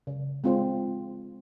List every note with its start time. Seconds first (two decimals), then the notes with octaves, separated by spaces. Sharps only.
0.07 C#3
0.44 G#3 C4 F4 C5